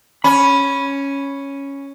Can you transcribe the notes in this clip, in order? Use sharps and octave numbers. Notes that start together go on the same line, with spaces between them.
C#4 B5